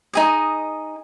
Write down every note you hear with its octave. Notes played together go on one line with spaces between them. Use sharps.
D#4 G#4 D#5